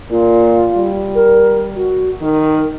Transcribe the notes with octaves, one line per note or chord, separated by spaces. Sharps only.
A#2 F4
G3
A#4
F#4
D#3 A#4